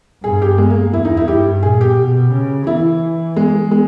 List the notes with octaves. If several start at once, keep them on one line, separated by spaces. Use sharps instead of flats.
G2 G#4
G4
G#3
A#3
E2 E4
D#4
E4
G2 G4
A#2 G#4
G4
B2
C#3
E3 E4
G#3
G#3